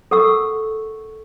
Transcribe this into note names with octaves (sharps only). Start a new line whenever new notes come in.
A4 A#4 F#5 C#6 E6